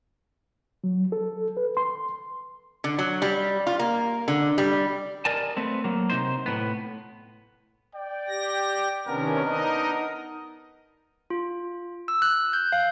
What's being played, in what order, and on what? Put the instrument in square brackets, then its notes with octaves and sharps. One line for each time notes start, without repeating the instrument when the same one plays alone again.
[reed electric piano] F#3
A4
B4
C6
[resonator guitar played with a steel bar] D3
F#3
G3
F4
A#3
D3
G3
[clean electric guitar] A#4 D5 D#5 G#5 A5
A3 B3 C4
F#3 A#3
C3 D#4 C5
A2 B3
[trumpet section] D5 G5
[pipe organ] G4 A#6
[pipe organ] C3 D#3 C#4 [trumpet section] B3 D4 A#4
[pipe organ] D#4 D#5
[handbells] F4
E6
F#6
G6
F5